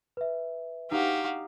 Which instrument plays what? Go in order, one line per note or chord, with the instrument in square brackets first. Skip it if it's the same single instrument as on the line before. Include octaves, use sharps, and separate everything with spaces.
[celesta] B4 E5
[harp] D#4 [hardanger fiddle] F#4 G4 [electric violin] F5